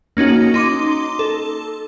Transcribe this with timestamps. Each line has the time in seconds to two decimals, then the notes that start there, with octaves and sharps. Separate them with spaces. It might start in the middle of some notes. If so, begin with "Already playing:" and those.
0.17 A#3 C#4 D#4 F#4
0.54 D#4 C6 D6
1.19 A4